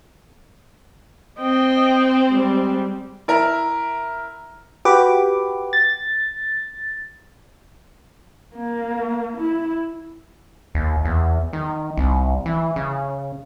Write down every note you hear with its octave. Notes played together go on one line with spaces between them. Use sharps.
C4 D#5 G5
G3 G#3
E4 A#4
F#4 G4 B4 D6
A6
A#3
E4
D#2
E2
D#3
C2
E3
C#3